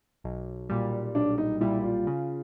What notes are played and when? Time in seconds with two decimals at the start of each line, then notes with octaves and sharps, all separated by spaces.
0.24 B1
0.70 A#2 G3
1.15 B1 D4
1.38 D#4
1.60 A#2 G3 E4
1.83 F4
2.07 C#3